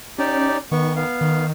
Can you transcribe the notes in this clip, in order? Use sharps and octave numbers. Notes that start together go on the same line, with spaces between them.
C#4 D#4 G4 D5
D#3 B3 C#6
B3 F5
D#3